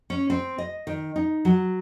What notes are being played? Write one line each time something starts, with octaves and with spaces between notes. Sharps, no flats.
C#4
C4
D#5
D#3
D#4
F#3